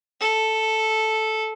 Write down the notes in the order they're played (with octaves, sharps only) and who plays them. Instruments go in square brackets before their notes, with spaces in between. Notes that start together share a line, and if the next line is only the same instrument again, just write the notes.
[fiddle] A4